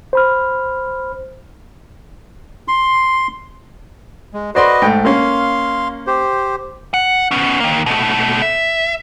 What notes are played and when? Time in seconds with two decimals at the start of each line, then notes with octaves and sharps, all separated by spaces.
0.13 C5 B5 F6
2.68 C6
4.34 G#3
4.55 F#4 B4 C5 D5 D#5 C6
4.82 G#2 A3 G5
5.05 A#3 C#4 F5 C6
6.07 G4 C5
6.94 F#5
7.31 B3 C#4
7.60 D#3 A#3
7.86 B2 A3
8.42 E5